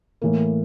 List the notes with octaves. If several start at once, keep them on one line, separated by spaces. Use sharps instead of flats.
A2 E3 A#3